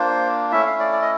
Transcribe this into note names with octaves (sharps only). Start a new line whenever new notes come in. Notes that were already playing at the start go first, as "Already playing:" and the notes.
Already playing: A#3 D4 F4 C5
A3 C#4 E4 E5
F5
D5
D5
D#5